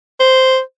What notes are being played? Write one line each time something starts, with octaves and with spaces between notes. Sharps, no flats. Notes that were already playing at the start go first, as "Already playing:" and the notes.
C5